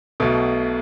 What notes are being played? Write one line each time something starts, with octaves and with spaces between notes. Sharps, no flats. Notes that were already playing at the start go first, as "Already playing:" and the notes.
B1 B2 A3